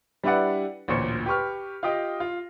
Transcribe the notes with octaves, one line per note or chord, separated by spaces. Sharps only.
G3 D4 E4 B4 D5 F#5
A1 D2 A#2 C5 C#6 C#7
G4 B4 C#6 F6
F4 G4 D#5 G5
F4